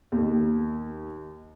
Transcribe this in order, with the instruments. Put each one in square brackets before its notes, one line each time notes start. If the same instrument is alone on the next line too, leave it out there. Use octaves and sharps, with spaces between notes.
[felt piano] D#2